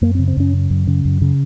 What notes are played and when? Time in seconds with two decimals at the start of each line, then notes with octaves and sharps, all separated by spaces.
0.02 F#2 A#3
0.15 C4
0.19 C#3
0.28 C4
0.37 F#2 C#4
0.53 C#3
0.70 F#2
0.87 C#3
1.05 F#2
1.22 C#3